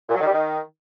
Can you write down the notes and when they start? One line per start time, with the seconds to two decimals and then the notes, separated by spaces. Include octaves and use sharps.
0.09 A#2
0.15 F#3
0.20 D#3
0.25 G3
0.31 D#3